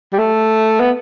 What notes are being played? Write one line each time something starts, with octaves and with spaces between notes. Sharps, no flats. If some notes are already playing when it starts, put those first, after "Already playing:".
G3
A3
B3